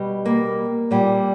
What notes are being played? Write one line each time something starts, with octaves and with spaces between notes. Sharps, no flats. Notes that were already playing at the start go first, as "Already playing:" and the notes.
Already playing: B2 G3
A#3
A#2 G3